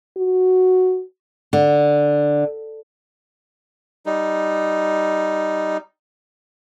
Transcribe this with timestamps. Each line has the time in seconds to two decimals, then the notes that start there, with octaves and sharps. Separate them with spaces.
0.17 F#4
1.53 D3
4.06 G3 D#4